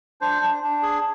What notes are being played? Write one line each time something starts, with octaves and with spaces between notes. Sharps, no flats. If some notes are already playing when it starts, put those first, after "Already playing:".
D4 C5
D4
D4
G#4